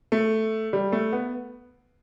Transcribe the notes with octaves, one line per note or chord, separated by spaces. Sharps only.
A3
G3
A3
B3